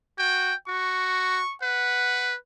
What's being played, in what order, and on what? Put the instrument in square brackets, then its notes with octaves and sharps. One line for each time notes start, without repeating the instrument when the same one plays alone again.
[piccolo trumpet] F#4 [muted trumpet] G5
[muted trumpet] F#4 [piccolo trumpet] C#6
[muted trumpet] B4 [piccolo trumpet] F#5